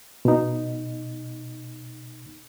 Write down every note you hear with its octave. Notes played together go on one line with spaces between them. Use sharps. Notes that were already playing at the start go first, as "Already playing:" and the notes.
B2 D#4